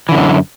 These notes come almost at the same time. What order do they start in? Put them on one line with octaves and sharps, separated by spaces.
E3 D3 F#2